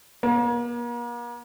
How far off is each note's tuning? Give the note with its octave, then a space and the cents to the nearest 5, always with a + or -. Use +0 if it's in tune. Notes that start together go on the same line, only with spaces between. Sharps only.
A#3 +45